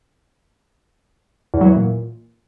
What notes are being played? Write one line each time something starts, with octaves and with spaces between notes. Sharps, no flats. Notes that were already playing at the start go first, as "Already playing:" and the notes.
E2
F#3
E3
A#2